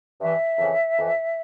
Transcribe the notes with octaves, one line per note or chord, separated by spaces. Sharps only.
G2 E3 E5
F2 C#3 E3
F2 E3